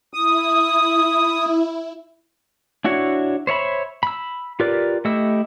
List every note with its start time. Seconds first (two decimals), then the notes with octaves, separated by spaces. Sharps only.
0.14 E4 D#6
2.85 D4 E4 F#4 C#5
3.47 C5 C#5 E5 B5
4.03 B5 E6
4.60 F4 G4 A#4 B4 D5
5.05 A3 E4 G4 D#5 E6